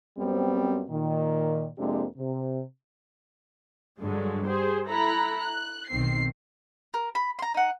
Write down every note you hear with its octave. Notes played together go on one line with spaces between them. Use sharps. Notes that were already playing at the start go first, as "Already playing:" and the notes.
F#2 G3 B3 C4
A#2 D#3
F2 C3 G#3 A#3 D4 G4
C3
G2 D3 F#3 G#3
G4 G#4 C5
E4 A4 A#5 B5 F#6
F#6
B1 D#3 C4 C7
A#4
B5
A#5 C6
D#4 F#5